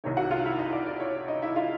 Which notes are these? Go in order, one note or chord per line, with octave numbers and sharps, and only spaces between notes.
C2 C3 D#3 C#5
F#4 F#5
F4 F5
E4 E5
D#4 D#5
D5
D5
C#5
D#4 D#5
E4 E5
F4 F5